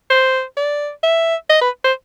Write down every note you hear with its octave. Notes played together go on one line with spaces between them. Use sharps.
C5
D5
E5
D#5
B4
C5